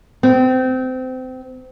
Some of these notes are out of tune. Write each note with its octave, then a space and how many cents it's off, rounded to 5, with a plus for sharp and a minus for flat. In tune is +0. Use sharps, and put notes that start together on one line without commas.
C4 -25